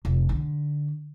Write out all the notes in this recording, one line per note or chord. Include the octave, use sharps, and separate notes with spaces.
F1
D3